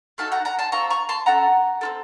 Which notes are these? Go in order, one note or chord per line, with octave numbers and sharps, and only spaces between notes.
A3 D#4 F#4 A4 F5 A5
F#5 A#5
F#5 A#5
A5 C6
C4 F4 A4 A#5 C#6
A#5 C#6
A5 C6
C#4 A4 F#5 A#5
C4 F4 A4